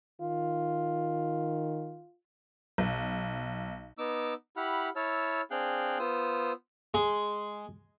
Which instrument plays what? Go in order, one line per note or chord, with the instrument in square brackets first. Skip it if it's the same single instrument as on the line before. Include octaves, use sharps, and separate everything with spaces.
[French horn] D#3 [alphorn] F4
[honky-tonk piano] B1
[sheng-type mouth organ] B3 D#4 D6 E6
E4 G4 F#5 B5 F6
E4 C#5 A5 E6 F6
C4 D4 G#4 F5 G5 F#6
B3 F4 C5 D#6 E6
[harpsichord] G#3